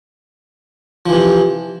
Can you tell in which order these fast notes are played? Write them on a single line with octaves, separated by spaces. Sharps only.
F3 E3 C3